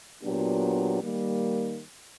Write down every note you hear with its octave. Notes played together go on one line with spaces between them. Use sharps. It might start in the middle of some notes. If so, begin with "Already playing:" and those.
A#2 F#3 B3 D4 G4
D#3 G3 A#3